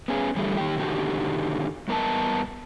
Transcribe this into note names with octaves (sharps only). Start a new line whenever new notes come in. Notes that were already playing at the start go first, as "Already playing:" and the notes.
B3 C#4 G#4
D3 E3 G3 A3
D#3 G4
B2 D3 D#3 D#4 F#4 G4
G2 B3 A#4 D#5 A5